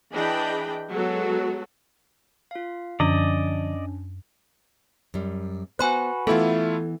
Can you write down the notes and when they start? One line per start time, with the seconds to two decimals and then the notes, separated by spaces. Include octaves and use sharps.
0.11 E3 D4 G#4 D#5 G5 B5
0.91 F#3 G#3 B3 F#4 A4
2.51 F4 F5
3.00 F#2 D3 F3 C#4 D4 D5 D#5
5.14 F#2 G3
5.79 B3 F#4 B4 C5 G#5 B5 F#6
6.27 E3 A3 B3 E4 F4 A4